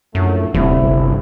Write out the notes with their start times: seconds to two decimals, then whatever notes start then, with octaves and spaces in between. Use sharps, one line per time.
0.15 A#1 F#2 A2 A3
0.54 D#1 D2 C3 E4
0.84 G1